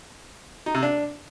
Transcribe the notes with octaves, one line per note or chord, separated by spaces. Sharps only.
D#4
C3
D4